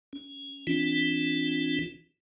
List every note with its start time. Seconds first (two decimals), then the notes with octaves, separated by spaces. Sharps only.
0.13 C#4
0.67 E3 C4 D4 F4